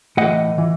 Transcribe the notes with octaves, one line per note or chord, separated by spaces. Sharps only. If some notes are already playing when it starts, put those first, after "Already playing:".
A2 E3 D#5 F#5
E3